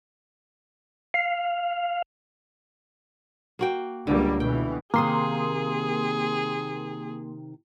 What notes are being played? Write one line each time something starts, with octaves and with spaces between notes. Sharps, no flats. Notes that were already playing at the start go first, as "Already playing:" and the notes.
F5
A#3 F#4 G5
C#2 D3 G3 A#3
B2 E3 G5
C3 D#3 A#3 G#4 C6 D#6